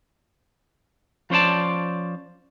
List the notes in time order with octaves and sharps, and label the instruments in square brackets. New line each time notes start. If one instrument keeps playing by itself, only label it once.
[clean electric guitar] F3 C#4 C5 D5 A5